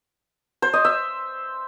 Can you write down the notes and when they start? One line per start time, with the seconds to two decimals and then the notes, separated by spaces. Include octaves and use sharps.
0.62 C5
0.73 D#5
0.85 E5